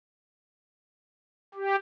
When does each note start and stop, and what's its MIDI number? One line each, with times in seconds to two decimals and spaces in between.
1.54 1.76 67